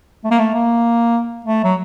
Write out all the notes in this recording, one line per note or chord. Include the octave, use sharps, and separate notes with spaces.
A3
A#3
A3
A#3
A3
F#3